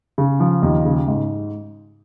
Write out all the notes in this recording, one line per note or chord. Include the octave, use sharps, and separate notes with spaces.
C#3
F3
D#2
C#3
G#2